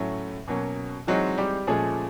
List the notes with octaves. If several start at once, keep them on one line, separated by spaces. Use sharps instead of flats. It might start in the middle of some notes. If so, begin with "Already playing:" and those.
Already playing: A2 F#3 A3 C#4
B2 F#3 A#3 C#4
E3 F#3 G#3 C4 D#4 F#4
G3 G4
A#2 F3 G#3 A3 C#4 G#4